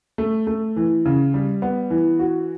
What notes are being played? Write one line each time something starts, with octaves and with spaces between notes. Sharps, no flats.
A3
A3
E3
C#3
G3
B3
E3
F#4